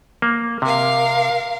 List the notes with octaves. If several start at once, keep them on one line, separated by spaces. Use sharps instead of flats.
A#3
C3 A#4 F5